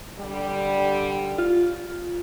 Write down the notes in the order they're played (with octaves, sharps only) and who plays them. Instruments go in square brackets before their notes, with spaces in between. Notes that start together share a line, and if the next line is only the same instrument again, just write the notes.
[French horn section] D3 G3
[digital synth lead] F4